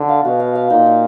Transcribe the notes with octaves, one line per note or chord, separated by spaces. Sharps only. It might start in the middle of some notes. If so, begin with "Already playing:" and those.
Already playing: D3
F5
B2 F#4
F5
F5
A#2 D#4
D#4